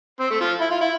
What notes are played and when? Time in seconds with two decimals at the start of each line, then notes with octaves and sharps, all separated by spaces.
0.20 C4
0.30 A3
0.41 F3
0.61 E4
0.71 F4
0.81 E4